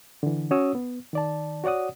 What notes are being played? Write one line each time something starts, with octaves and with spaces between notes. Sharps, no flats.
D3 E3
C#4 F#4 C#5 D#6 E6
B3
D#3 D5 A5
F#4 C#5 D5 F#5 D#6